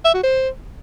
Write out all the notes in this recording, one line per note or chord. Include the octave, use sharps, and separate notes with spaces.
E5
F#4
C5